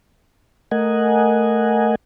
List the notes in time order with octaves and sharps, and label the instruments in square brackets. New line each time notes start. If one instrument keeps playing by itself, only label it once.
[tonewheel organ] A3 A#4 D#5 F#5 G#5